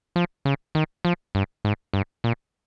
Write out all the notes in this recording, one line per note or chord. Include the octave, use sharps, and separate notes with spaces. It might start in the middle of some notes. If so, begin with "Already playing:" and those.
F3
C#3
D#3
F3
G2
G#2
G2
A#2